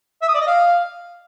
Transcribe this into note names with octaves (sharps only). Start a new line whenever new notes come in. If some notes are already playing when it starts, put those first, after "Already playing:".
E5
D#6
D5
D#5
F5